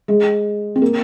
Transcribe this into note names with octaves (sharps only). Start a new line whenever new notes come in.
G#3
C4
A#3